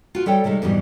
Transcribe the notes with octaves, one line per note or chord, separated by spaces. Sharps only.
F4 F#4
G3 A4 C#5 G5
C3 D#3 G3 G#3
F2 G#2 B2 E3 G3